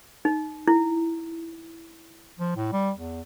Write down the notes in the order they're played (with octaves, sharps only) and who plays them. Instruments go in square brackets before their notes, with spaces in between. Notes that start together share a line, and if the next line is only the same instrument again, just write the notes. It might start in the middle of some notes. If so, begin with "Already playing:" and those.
[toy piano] D#4
E4
[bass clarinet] F3
A2
G3
E2